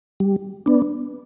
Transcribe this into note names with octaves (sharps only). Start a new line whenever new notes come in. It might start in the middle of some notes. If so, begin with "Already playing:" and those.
G3
B3 D4